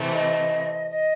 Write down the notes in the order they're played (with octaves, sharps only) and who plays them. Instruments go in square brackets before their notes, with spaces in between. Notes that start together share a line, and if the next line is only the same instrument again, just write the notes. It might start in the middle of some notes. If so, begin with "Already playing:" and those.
Already playing: [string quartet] C3 E3 A3 C4
[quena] D#5
D#5